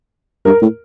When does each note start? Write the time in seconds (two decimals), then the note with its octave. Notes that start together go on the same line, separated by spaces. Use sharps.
0.45 G2 A#4
0.61 A2